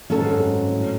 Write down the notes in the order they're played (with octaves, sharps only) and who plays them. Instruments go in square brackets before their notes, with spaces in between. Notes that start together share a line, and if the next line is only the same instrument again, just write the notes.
[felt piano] D#3 [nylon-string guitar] F#3 C#4 F#4 A4
[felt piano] G#2
F#2
G#2
A2